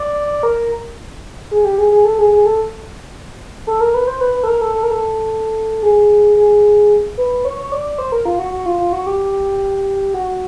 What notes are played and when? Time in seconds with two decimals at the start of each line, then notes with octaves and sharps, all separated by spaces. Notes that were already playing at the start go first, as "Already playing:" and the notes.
Already playing: D5
0.43 A#4
1.51 G#4
1.65 G4
1.78 G#4
1.92 G#4
2.05 A4
2.19 G#4
2.32 G#4
2.46 A4
3.67 A4
3.80 A#4
3.94 B4
4.07 C5
4.21 B4
4.34 B4
4.43 A4
4.48 A#4
4.61 A4
4.75 A4
4.83 A#4
4.91 A4
5.83 G#4
6.37 G#4
7.18 B4
7.45 C#5
7.58 C#5
7.72 D5
7.85 D5
7.98 C5
8.12 A#4
8.25 F4
8.39 F#4
8.52 F#4
8.66 F4
8.80 F4
8.93 F#4
9.07 G4
10.14 F#4